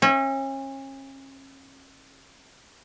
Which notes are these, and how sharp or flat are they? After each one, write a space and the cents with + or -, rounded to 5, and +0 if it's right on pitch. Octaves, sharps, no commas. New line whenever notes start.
C#4 -35 E5 -20